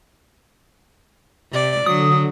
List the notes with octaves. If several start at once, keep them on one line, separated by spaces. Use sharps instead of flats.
C3 D5
D3 F#3 D#6